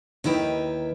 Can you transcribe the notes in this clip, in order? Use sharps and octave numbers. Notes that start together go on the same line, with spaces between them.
D#2 D#3 E4 B4 G5